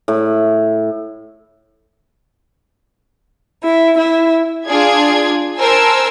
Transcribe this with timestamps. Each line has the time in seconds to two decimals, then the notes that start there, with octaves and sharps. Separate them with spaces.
0.08 A2
3.64 E4
3.99 E4
4.69 D4 F4 G#4 G#6
5.59 A#4 C5 G#5 A5 E6